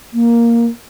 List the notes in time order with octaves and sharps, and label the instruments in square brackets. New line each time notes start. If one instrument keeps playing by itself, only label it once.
[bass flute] A#3